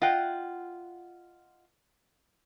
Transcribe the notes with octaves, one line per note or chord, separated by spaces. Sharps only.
F4 D#5 F#5 G5